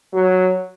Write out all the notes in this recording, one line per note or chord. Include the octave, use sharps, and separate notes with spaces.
F#3